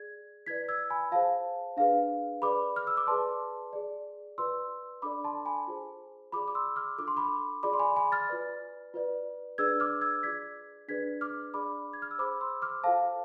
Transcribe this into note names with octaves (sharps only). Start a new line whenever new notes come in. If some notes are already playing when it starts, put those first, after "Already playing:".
Already playing: G#4 D5 G#6
E4 B4 D5 G#6 B6
E6 G#6
G#5 B5
F4 G#4 C5 F5 A5
D4 G#4 B4 F5
G#4 B4 D5 B5 D6
F6
E6
D6
G#4 B4 D5 A5 C6
G#4 D5
F4 B4 D5 C6 E6
D4 A4 D5 B5 D6
A5 C6
G#5 B5
F4 G#4 C5
F4 G#4 D5 B5 D6
D6
C6 E6
D6 F6
D4 F4 A4 D6
C6
B5 D6
F4 G#4 D5 B5 D6
C6
G#5 B5
G#5 B5
F6 A6
F4 B4 D5
F4 B4 D5
D4 G#4 B4 D5 E6 G#6
D6 F6
E6 G#6
F4 G#4 D5 G#6 B6
D4 G#4 B4 D5 G#6 B6
D6 F6
D4 G#4 D5 B5 D6
G#6
F6
E6
G#4 C5 B5 D6
C6 E6
D6 F6
F4 A4 C5 F5 A5